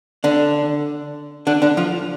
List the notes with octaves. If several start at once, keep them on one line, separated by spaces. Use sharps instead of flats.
D3 D4
D3 D4
D3 D4
F3 F4